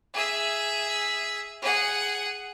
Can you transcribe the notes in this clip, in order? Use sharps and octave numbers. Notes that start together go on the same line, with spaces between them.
G#4 E5
G#4 F#5